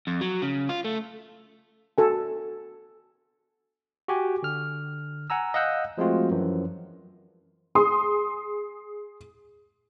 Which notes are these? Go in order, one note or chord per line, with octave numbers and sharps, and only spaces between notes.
F2
F#3
C#3
F4
A3
F#4 A4 G#5
F#4 G4 G#5
D3 F6
F#5 G#5 A#5 E6
D#5 F5 F#5 E6 F#6 G6
F3 G#3 A3 C4 F4 F#4
F#2 E3 F3
G#4 C6 D#6